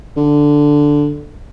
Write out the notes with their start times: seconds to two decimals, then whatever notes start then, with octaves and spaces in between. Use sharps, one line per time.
0.17 D3